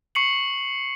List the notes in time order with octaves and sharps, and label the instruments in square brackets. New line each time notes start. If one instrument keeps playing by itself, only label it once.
[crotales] C#6 C7 C#7 F#7